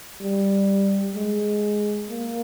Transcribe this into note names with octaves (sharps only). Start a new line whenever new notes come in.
G3
G#3
A#3